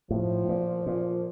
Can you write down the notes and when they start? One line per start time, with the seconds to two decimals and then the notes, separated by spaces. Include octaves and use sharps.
0.11 A2 F3
0.49 A#2
0.86 A#2